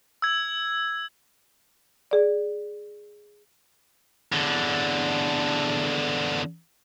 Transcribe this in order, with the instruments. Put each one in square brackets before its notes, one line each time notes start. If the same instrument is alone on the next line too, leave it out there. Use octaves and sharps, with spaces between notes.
[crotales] E6 G#6
[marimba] G#4 D5
[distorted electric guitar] E2 D3